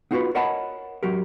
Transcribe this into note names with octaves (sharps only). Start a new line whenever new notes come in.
B3 D#4 F4 F#4 A#4 B4
A#4 C#5 D#5 F#5 A5 B5
F#3 F#4 G4 A#4